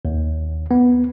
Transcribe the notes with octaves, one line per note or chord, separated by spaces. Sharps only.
D#2
B3